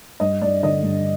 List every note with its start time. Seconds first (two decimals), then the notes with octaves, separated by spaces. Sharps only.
0.20 G2 D#5
0.42 G2 D5
0.63 D3 D#5
0.83 G2